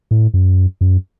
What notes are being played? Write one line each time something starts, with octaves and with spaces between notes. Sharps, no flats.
A2
F#2
F#2